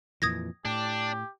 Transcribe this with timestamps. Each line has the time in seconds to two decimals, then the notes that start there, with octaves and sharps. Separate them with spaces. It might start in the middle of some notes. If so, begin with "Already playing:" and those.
0.22 F2 A#2 E3 D#6 G#6 A#6
0.65 A2 D4 G4